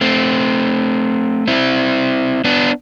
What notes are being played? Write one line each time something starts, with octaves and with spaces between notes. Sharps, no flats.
A3 C4
C4 E4
B3 D4